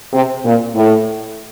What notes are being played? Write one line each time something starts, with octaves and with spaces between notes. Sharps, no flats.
C3
A#2
A2